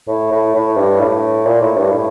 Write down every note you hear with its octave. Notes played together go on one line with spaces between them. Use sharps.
A2
A2
A2
G2
A2
A#2
A2
G2
A2